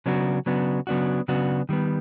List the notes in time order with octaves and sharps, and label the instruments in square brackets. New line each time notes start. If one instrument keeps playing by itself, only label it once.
[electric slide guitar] C#3 F#3 B3 D4 F#4
C#3 F#3 B3 D4 F#4
C#3 F#3 B3 D4 F#4
C#3 F#3 B3 D4 F#4
D#3 G3 B3